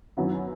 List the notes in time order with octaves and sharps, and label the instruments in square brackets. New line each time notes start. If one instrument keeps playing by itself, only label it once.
[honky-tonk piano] F#2 D#3 F#3 B3 E4